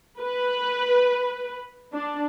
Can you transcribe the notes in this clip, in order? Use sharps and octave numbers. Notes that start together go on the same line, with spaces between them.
B4
D4